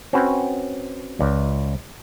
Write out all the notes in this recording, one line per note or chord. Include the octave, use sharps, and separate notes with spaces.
C4 C#4 F#4 B4
C#2 D5